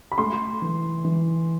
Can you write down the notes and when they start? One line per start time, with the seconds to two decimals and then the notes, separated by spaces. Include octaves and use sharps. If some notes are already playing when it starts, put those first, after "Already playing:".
0.12 B5
0.18 A3 C6
0.62 E3
1.04 E3